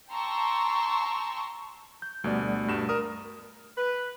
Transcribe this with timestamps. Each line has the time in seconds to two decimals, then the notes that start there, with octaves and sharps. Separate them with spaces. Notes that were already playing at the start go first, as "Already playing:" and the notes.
0.11 G5 A5 A#5 C6 C#6 E6
2.02 G6
2.24 D2 B2 G3 A3 D5
2.68 G2 B2 E7
2.89 A#4 D#6
3.78 B4